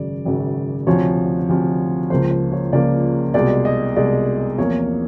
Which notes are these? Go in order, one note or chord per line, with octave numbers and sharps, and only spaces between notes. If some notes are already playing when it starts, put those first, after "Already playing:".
Already playing: G#1 F#2 C#3 D5
G#1 F#2 C#3
D2 C3 F3 C#5
D2 C3 F3
C#2 C#3 F3 A#3 C5
C5
C#5
C#2 C#3 F3 A#3 D5
C2 B2 G#3 D5
D#5
C2 B2 G#3 D5
E2 C3 F3 A#3 C#5